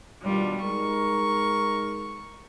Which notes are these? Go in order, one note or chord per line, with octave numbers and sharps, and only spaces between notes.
B2 D#3 G3 D4 F4
G#3 D#4 A#4 C#6